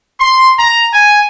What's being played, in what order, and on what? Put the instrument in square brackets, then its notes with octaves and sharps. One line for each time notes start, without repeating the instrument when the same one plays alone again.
[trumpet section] C6
A#5
G#5